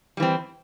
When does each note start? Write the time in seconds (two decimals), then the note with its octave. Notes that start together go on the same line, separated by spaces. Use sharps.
0.17 G3
0.20 E3
0.22 C4